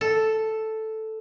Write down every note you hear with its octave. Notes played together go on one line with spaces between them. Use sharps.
A4